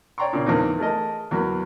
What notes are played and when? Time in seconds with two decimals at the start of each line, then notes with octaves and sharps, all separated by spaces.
0.18 C#5 D5 G5 A#5 C6 C#6
0.33 A#2 C#3
0.46 E2 F3 A#3 C4 D#4
0.79 A3 G#4 A#4 D#5
1.31 E2 F#3 A#3 B5